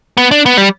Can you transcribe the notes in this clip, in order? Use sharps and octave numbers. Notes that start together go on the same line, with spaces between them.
B3
D4
B3
G3